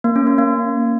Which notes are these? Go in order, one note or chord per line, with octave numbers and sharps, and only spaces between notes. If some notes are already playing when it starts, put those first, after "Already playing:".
A#3
C#4
A#3
A#3